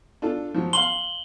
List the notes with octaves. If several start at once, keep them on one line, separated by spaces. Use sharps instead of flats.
D4 F4 A4
F3 F#3
F5 C6 F#7 G7